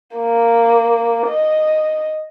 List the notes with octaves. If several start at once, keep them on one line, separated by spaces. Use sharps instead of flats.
A#3
D#5